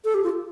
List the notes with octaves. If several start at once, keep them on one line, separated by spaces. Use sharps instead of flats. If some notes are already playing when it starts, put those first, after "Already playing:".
A4
G4
F4